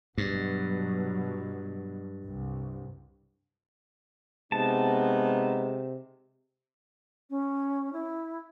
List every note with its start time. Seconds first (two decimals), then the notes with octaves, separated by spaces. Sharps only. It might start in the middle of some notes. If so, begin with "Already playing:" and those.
0.18 G2 B2 F#3
2.23 C2
4.52 C3 G#3 B3 D#4 A5
7.30 C#4
7.93 E4